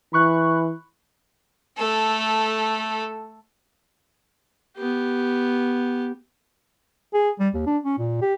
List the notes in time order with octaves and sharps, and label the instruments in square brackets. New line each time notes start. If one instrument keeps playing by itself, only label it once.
[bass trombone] E3 [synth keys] B5 C#6 F#6
[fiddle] A3 A4
[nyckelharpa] B3 G4
[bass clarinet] G#4
G3
D#2
D4
C#4
A#2
G4